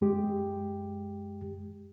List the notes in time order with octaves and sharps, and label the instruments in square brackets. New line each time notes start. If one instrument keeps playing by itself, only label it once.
[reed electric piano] F#2 G#3 G4